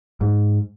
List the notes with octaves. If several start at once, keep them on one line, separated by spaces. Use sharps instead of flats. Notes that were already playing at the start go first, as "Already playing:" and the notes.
G#2